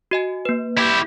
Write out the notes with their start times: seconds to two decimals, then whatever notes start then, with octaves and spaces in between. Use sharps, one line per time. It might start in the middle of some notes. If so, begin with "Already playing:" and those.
0.11 F#4 D#5 G#5
0.45 A#3 B4
0.78 E4 G4